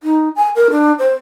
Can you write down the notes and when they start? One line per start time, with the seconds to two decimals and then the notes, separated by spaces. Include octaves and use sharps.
0.03 D#4
0.36 G#5
0.55 A#4
0.71 D4
0.99 C5